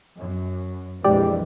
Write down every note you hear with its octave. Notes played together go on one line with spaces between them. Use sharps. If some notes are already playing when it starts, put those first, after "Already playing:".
F#2
A#1 F2 E3 G#3 G4 D5